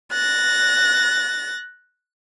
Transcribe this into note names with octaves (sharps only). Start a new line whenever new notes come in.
F#6 A6 A#6